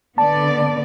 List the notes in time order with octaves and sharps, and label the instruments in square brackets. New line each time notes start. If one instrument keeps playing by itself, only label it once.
[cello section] D3 B3 D5 [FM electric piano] A5